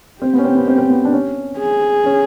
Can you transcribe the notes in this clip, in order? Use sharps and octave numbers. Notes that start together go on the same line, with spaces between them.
C4 G4
B3 C#4
C4
B3
C4
C4
B3
D4
C#4
G#4
C#4